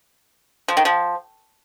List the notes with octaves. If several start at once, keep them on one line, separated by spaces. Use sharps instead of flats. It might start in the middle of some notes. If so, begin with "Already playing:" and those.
F3
D#3
F3